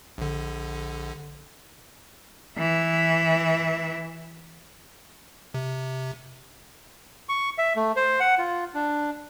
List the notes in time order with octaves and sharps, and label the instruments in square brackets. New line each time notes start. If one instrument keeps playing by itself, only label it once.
[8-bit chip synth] A#1 D3
[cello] E3 E5
[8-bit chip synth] C3
[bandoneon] C#6
E5
A3
C5
F#5
F4
D4